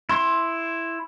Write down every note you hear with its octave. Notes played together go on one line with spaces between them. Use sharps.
E4 C6